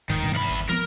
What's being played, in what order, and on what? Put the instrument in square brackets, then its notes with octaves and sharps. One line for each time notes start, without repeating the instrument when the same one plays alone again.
[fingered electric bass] D#1 G#2 [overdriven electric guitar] D#3
[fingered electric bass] G2 B2
[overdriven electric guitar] E2 B5
[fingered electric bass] G#1
[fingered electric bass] F3 G#3 B3 [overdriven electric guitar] A#4